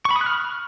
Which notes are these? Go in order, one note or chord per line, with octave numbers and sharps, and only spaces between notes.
C#6
B5
D#6
F#6
F6